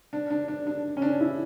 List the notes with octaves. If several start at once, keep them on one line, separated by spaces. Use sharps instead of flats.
D4
D4
D4
D4
C#4
D4
E4